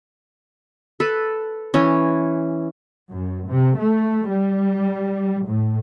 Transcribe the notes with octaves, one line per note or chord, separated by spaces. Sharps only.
A4 B4
E3 C#4
F#2
C3
A3
G3
A2